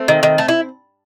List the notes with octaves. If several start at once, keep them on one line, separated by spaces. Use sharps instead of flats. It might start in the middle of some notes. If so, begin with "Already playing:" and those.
Already playing: A3 C4
D#3
D#3
A3
E4